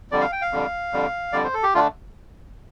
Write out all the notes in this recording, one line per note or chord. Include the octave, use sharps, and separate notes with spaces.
F2 D3 G3 D5
F5
G5
F5
F2 D3 G3
F2 D3 G3
F2 D3 G3 D5
C5
A4
G4
D3 A3 D4 F4